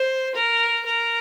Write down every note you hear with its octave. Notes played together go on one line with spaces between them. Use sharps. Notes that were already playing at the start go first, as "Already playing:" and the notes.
Already playing: C5
A#4
A#4